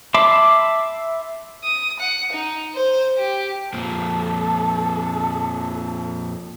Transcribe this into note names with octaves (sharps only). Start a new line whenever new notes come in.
E5 A5 B5 C6 D6
D#6
F#5
D#4
C5
G4
F2 A#2 F3 A4